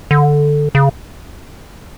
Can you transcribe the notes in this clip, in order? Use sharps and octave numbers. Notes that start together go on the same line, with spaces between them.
D3
C#3